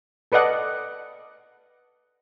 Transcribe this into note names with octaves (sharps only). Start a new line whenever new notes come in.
A4 B4 D5 D#5 F#5